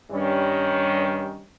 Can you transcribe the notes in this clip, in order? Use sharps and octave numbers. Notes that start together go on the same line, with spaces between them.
G2 D#3 G3 C#4